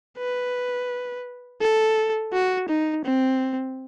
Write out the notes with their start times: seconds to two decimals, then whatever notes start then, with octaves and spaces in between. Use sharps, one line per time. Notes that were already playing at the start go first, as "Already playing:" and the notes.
0.17 B4
1.61 A4
2.33 F#4
2.69 D#4
3.05 C4